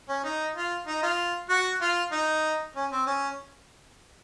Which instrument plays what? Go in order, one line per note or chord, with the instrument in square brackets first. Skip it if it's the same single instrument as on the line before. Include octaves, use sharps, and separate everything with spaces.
[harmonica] C#4
D#4
F4
D#4
F4
F#4
F4
D#4
C#4
C4
C#4